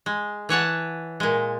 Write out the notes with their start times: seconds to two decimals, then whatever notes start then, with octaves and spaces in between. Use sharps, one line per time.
0.06 G#3
0.49 E3 C#5 F#5 A5
1.20 A#2 G#3